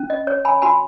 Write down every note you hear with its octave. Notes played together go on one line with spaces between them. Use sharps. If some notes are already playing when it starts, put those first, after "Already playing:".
Already playing: C#4
D#5
C#5
G#5 B5
F#4 G#5 B5